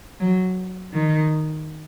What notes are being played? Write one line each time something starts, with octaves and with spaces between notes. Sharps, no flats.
F#3
D#3